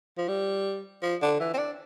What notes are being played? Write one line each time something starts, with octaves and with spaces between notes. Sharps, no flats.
F3
G3
F3
D3
E3
C4
D4